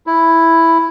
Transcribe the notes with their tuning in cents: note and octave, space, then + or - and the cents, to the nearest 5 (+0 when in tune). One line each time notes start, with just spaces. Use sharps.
E4 +0